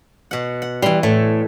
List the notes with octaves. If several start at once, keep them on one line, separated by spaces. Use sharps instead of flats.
B2 F#5
F#5
E3 G3 C6
A2 A3